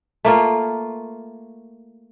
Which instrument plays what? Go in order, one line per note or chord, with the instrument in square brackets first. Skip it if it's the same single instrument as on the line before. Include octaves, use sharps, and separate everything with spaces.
[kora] A3 A#3 F4